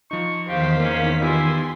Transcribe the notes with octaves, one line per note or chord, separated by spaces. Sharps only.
F3 D#4 C#6
E2 D#3 G4 C5 F5 B6
A#3 C#4
B3 E4 F4 G4 G#5 C6